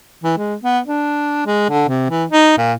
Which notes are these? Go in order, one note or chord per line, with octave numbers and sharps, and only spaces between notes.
E3
G#3
B3
D4
G#3
D3
C3
E3
D#4
A#2